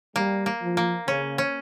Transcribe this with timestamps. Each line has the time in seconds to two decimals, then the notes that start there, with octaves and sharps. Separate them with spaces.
0.15 G3 A#3
0.46 A#3
0.62 F3
0.77 A#3
1.08 C#3 C#4
1.38 C#4